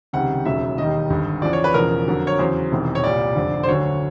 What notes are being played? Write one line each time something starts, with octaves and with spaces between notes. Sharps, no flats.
C#2 C3 D#3 G3 F#5
E1 D#2 C#3 F#3 E5
E1 D#2 D#3 G3 D#5
G#1 G2 D3
E2 C#3 F3 D5
C#5
B4
E1 E2 C#3 F3 A#4
F2 D3 F#3
C#5
E2 C#3 F#3 C5
E1 E2 C3 D#3
C#5
C2 A#2 G3 D5
F1 F2 D3
C5
D2 D3 F#3 C#5